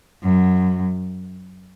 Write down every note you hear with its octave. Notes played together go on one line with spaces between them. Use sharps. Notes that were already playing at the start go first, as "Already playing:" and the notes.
F#2